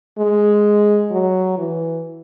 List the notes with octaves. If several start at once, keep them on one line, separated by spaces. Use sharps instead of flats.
G#3
F#3
E3